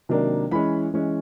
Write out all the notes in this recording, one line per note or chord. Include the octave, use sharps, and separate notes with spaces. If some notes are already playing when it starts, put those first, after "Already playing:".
C3 D#3 F#3 A#3 D4
E3 G#3 C#4 B5
E3 G#3 C#4